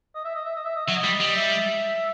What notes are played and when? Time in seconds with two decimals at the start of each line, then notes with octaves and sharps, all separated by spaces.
0.15 D#5
0.24 E5
0.35 D#5
0.45 E5
0.56 D#5
0.65 E5
0.76 D#5
0.86 F#3 E5
0.96 D#5
1.04 G3
1.20 G3
1.36 E5